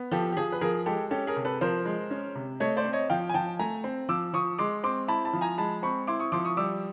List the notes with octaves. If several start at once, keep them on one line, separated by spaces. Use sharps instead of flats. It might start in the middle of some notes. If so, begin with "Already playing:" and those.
Already playing: B3
F3 G4 A4
G4
F3 G#4
B4
F3 G#4 A#4
G#3 G4 A4
C#4 G4 A4
G#4 A#4
C3
A4 B4
F3 A#4 C5
G#3
C#4
C3
A3 C#5 D#5
C5 D5
C4
C#5 D#5
F3 F5 G5
G#5
F3 G5 A5
A3 G#5 A#5
C4
F3 D6 E6
F3 C#6 D#6
G#3 C6 D6
C4 C6 D6
E4 A5 B5
A5 B5
F3
G#5 A#5
G#3 A5 B5
C4 B5 C#6
E4 C6 D6
C#6 D#6
F3 C6 D6
C#6 D#6
G3 D6 E6